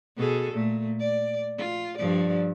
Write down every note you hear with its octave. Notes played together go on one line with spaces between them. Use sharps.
B2 G#4 A4
A#2 A3
D5
F4
G2 F3 D5